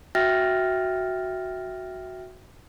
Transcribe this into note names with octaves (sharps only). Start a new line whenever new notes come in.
F#4 E5 G5 F6 A6 A#6